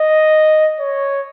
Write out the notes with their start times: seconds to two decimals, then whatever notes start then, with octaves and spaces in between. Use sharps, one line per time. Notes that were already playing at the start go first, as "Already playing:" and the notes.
Already playing: D#5
0.80 C#5